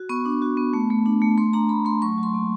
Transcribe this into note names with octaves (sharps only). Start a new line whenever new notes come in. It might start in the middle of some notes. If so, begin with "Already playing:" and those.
Already playing: F#4
B3 C#6
D4
F#4
B3
A3
A3
D4
A3
A3 C6
D4 A#5
A3 B5
A3 C6
F#3 C#6
F#3
C6
A#3